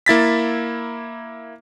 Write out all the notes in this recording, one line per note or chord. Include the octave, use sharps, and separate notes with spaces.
A#3 E4 A6 B6